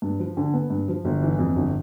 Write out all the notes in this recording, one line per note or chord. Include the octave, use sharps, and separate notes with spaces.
G2
F3
D3
B3
G2
F3
G1
E3
F2
G1